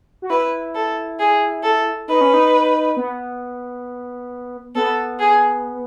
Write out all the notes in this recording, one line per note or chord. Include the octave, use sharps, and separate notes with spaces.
F#4
E4 B4
A4
G#4
A4
D#4 B4
C#4
D#4
B3
B3 A4
G#4